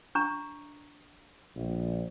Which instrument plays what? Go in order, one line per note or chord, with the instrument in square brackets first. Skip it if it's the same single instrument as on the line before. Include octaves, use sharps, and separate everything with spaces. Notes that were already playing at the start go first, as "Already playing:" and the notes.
[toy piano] D4 A#5 C#6
[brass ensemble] A#1